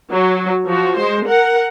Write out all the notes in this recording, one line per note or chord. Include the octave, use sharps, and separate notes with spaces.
F#3
F3 F#4
G#3 C5
A#4 F#5